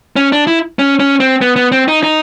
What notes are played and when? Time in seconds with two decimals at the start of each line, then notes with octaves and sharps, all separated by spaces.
0.16 C#4
0.32 D4
0.47 E4
0.79 C#4
1.00 C#4
1.20 C4
1.41 B3
1.56 B3
1.72 C4
1.88 D#4
2.03 D#4